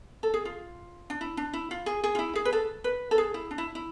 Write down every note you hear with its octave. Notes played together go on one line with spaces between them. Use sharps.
A4
G#4
F4
D4
E4
D4
E4
F4
G#4
G#4
F4
E4
G#4
B4
A4
B4
A4
G#4
E4
D4
E4
E4